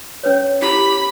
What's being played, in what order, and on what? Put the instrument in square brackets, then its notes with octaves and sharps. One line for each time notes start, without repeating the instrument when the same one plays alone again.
[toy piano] C#4 B4 C#5
[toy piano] E4 A#5 [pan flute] G4 [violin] B5 B6